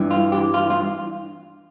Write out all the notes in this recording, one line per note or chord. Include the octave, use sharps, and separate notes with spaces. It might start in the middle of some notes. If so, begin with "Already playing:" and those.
Already playing: G2 E3
F4
G4
F4
F4